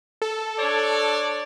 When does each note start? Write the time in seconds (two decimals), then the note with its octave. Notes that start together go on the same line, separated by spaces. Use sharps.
0.22 A4
0.59 D4 C#5 D5